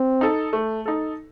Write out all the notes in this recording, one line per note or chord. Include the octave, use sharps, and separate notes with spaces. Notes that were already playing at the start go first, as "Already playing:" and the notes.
Already playing: C4
D#4 A4
A3
D#4 A4